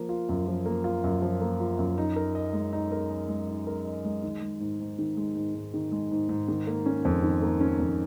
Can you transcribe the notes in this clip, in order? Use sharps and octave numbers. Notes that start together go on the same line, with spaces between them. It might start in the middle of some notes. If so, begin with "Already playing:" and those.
Already playing: F3 A#3
F4
F#2
F3
A#3
F4
F#2
F3
A#3
F4
F#2
D#4
A#4
D#5
G#3
D#4
A#4
D#5
G#3
D#4
A#4
D#5
G#3
D#3
G#3
G#2
G#2
D#3
G#3
G#2
G#2
D#3
G#3
G#2
G#2
D#3
A#3
C#4
F2
D#3
A#3
C#4
F2